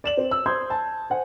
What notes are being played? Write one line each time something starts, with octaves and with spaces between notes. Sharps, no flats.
D5 E7 F#7
C4
E6
C5 C6 D#6 G6 G#6
A5
C5 F#5 G#5